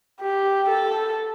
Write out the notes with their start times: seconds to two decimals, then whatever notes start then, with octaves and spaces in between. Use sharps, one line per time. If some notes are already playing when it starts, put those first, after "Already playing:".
0.21 G4
0.69 A4